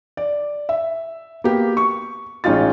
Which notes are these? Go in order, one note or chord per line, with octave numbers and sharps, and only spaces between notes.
D5
E5
A#3 B3 G4
C#6
A1 G#3 C#4 D#4 F4 A6